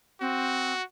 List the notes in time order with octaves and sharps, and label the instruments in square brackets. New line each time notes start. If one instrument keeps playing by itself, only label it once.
[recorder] C4 [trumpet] F#4